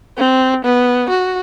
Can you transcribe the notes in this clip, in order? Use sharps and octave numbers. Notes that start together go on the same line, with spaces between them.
C4
B3
F#4